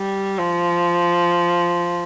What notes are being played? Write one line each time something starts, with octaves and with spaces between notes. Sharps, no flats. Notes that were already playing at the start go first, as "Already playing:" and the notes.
Already playing: G3
F3